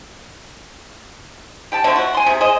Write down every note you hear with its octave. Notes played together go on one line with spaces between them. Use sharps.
G4 G5 A5
B2 D3 F3 A3
F#4
G#5 C6
C3 G#4
G#4 C5 D#5